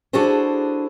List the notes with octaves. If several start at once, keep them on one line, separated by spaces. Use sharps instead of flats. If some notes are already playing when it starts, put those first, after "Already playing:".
D4 E4 F#4 G#4 A4 C5